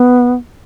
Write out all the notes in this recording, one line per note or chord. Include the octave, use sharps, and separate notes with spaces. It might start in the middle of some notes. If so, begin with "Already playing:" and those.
Already playing: B3